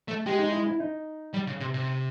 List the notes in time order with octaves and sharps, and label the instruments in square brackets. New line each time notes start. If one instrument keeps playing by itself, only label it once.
[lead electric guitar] A3
[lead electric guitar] G#3 [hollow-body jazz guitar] G4
[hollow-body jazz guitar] D#4
E4
E4
D#4
[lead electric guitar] G3
C#3
C3
C3